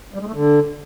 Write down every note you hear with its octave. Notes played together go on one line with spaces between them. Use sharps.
G3
G#3
A3
D3